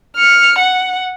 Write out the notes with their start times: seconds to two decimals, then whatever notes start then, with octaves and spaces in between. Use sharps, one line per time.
0.16 F6 C#7
0.59 F#5